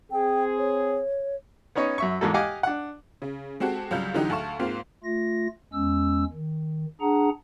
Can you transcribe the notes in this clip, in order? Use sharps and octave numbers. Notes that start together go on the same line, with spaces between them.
C4 G#4 G5
C#5
B3 C#4 D#4 C#5
F#2 E5 C#6
E2 G#2 A#3 F#4 A4
G4 D#5 F5 F#5 G#5 D6
D4 F#5
C#3
G#3 C4 F#4 G4 A4
C#2 F#3 G3 F5 G6
D3 E3 F#3 D#4 G4
D2 A4 F5 C#6 E7
G#2 A#3 C4 F4 F5
A3 F4 A#6
E2 G#3 C#4 E6
D#3
D4 G#4 F#5 A#5